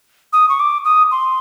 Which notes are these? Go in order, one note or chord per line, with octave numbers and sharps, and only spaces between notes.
D#6
C#6
D6
D#6
C6